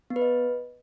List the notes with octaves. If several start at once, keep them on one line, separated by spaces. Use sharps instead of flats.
B3
B4
D#5